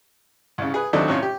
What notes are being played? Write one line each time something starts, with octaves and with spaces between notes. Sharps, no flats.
C2 C#3
G#4 B4
D#2 F#3 A3 C4 D4 D#4
A2 C3 C#4 F4
G4